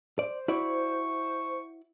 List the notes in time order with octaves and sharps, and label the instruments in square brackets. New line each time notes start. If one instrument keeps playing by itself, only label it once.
[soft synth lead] C5 [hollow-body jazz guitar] D5
[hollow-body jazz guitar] E4 F#4 D5 [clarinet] C#6